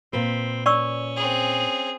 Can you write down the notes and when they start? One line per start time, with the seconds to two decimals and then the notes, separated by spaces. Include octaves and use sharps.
0.13 A#2 C4 B4
0.66 C#4 D5 C#6 E6
1.16 C4 G#4